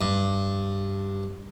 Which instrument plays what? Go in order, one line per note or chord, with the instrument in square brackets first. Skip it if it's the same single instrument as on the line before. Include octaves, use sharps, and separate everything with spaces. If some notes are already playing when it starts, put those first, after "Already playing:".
[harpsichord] G2